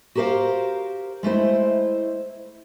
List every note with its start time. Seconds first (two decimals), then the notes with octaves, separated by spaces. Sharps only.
0.15 F#4 G4 A#4 C5 F5
1.23 G#3 A3 E4 C5